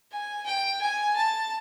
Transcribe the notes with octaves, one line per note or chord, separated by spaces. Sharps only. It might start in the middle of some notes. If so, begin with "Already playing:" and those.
G#5
G5
G#5
A5